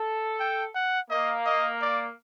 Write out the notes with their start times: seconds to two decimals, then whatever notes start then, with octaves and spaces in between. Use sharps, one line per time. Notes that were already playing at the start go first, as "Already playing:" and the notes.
Already playing: A4
0.40 G5
0.75 F#5
1.10 A#3 D#5
1.46 D#5
1.81 D5